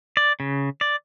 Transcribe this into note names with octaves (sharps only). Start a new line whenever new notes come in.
D5
C#3
D5